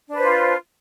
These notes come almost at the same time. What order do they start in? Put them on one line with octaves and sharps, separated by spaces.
D4 B4 C5 F4